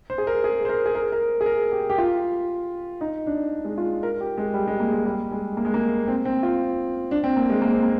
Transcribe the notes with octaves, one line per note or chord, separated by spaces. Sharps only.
C5
G#4
A#4
G#4
C5
A#4
G#4
A#4
A#4
G#4
A#4
G4
G4
F4
D#4
D4
G#3
F4
A#4
G4
G#3
G3
G#3
A#3
G#3
G3
G#3
A#3
G#3
A#3
C4
C4
F4
D4
C4
A#3
G#3
A#3
C4
A#3